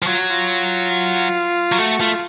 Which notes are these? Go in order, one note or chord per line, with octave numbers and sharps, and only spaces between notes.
F3
F#3 F4
F#4
F4
F#3
A3 F#4
A3 F4